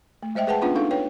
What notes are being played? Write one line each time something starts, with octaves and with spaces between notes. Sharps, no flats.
A3
G#3 C5 D#5 E5 G5
G#4 B4 F#5 G5 A5
B3 C#4 D4 F4 B4 F#5
D4 D#4 A4 F5
B4 C#5 G5